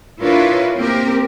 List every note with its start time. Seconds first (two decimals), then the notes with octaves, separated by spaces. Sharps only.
0.21 D4 E4 F4 A#4 B4 C#5
0.75 A#3 C4 G4 A#4